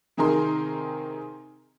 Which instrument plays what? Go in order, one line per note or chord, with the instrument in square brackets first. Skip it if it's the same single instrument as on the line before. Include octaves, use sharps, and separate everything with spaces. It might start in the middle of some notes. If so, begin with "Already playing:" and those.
[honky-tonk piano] C3 D#3 D#4 G#4 A#4 C6